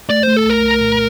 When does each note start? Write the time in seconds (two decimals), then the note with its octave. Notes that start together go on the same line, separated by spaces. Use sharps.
0.10 A3 D5
0.23 A3 C5
0.37 A4
0.46 C2 A#4
0.64 C2
0.81 A#2